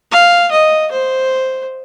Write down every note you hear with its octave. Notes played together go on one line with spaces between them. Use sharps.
F5
D#5
C5